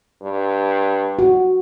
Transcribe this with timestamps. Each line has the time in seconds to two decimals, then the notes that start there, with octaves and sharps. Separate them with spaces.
0.22 G2
1.19 F#4